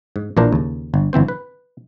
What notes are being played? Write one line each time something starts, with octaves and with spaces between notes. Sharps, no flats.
G#2
A#1 A#2 E3 D4 A#4 C5
D#2 C#3
G1
G1 E3 C4 C5
B4